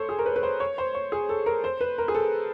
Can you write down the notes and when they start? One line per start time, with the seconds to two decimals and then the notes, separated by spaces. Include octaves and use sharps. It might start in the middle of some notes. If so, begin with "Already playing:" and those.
Already playing: A4 C5 C#5
0.09 G#4
0.19 A#4
0.26 B4
0.36 B4
0.43 C5
0.60 C#5
0.78 C5
0.94 C#5
1.12 G#4
1.29 A4
1.46 A#4
1.64 C5
1.81 B4
1.98 A#4
2.08 G#4
2.14 A4